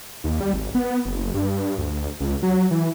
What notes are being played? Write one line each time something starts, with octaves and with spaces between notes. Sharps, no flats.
D#2
G3
G#1
B3
F#1
G2
D2
C#2
F#3
E3